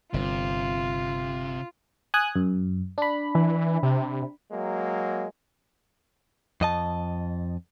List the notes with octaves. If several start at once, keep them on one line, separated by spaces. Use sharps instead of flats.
G1 C3 F4
G#5 D#6 F#6
F#2
D4 B5
E3
C3
F#3 G#3 A#3
F2 D#5 A5